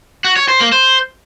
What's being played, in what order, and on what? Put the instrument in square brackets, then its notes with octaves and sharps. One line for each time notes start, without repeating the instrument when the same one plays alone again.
[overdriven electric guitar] F#4
C#5
C5
A#3
C5